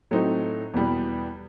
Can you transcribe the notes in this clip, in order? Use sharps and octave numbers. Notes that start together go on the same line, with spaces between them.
A2 F#3 A3 C4 D#4
E2 B2 G3 B3